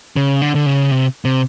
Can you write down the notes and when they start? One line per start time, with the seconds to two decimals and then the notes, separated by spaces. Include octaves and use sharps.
0.16 C#3
0.42 D3
0.55 D3
0.66 C#3
0.91 C3
1.25 C3